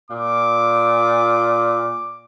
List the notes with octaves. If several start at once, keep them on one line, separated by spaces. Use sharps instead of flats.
A#2 D6